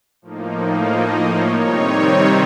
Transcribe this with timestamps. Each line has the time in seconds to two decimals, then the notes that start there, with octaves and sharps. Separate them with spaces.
0.22 A2 F3 A#3 D#4
0.89 D#5
1.23 C#5
1.57 C3 D#3 G3 C4 D#4 C#5